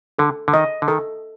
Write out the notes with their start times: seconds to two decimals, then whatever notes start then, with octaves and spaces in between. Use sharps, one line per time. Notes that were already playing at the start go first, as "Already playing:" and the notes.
0.19 D3 A4
0.48 D3
0.53 D#3 D#5
0.82 D3
0.88 D#3 A4